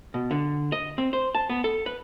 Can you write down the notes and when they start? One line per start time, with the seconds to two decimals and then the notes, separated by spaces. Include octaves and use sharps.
0.14 B2
0.31 D3
0.72 D#5
0.98 C4
1.13 C5
1.35 A5
1.49 B3
1.64 A4
1.86 B4